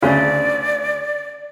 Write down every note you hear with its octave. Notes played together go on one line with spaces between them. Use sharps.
D2 C#3 D5